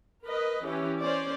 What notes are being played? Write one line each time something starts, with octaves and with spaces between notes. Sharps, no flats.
A#4 B4 D#5
E3 C#4 G4
C#4 C5 D5